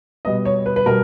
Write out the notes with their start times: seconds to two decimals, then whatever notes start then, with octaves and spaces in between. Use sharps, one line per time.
0.25 B2 G3 B3 D#5
0.45 C#5
0.66 B4
0.76 B4
0.86 B2 G3 B3 A#4